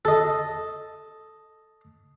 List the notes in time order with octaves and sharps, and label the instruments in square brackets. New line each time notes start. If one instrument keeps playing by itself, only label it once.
[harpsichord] A4 D#5